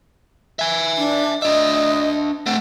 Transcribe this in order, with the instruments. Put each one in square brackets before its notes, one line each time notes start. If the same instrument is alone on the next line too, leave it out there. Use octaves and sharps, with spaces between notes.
[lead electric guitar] E5 G#5
[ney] D4
[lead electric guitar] D4 E5 [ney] D#5
[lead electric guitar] A3 C4 [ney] F#5